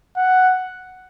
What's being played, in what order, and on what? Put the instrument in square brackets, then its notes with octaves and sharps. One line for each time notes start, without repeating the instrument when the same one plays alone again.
[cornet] F#5